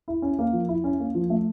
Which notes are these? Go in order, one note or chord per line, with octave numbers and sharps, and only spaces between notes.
E4
C#4
A#3
F3
E4
C#4
A#3
F3
A3